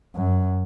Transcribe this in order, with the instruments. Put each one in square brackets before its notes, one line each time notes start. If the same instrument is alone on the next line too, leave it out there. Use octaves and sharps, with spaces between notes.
[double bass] F#2